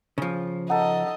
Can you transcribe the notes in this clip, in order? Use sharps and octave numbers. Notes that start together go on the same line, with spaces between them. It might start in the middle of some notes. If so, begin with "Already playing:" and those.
C#3 F3
D#4 A4 D#5 F#5